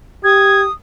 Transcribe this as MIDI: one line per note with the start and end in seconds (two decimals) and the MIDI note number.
0.24 0.66 67
0.24 0.72 87
0.24 0.61 92